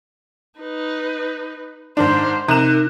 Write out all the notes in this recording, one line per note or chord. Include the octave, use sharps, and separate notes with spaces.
D#4 B4
G#2 D#3 D4 C5
C3 D#4 A#4 F#6 E7